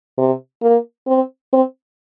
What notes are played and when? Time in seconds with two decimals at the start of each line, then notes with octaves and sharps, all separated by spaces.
0.18 C3
0.62 A#3
1.07 C4
1.53 C4